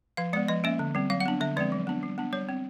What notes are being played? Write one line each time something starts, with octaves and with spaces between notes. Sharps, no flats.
F3 F5
G#3 B3 D5
F3 D#5
A#3 C#4 E5
D3
G3 C4
F#3 F5
F#5
B3 D4
D3 E5
F3 G#3 C4 D5
F#3
B3 D4
G3
B3 D4
G3 C#5
C4